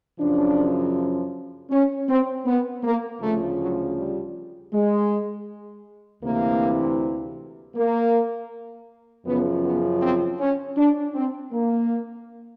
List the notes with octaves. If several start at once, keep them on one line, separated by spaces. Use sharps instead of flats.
F#2 C#3 F3 D4
C#4
C4
B3
A#3
D2 C#3 F3 A3
F#3
G3
G#3
D2 C3 E3 A#3
A#3
F#2 C#3 F3 B3
B3
C4
C#4
D4
C4
A#3